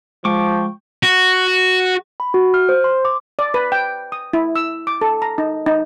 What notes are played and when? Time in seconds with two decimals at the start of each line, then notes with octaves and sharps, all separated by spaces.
0.25 F3 G#3 G5 C#6 D6
1.03 F#4
2.20 B5
2.34 F#4
2.54 F6
2.69 C5
2.84 C6
3.05 D6
3.39 D5
3.54 B4
3.72 G5
4.12 D#6
4.33 E4
4.56 E6
4.87 D6
5.01 A4
5.22 A#5
5.38 D#4
5.66 D#4